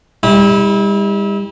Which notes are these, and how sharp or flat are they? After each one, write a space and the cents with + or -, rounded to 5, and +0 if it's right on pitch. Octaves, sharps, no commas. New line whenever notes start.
G3 +35 E4 -30